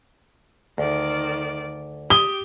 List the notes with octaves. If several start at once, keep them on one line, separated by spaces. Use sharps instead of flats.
D2 D#3 D5
G4 D#6 G7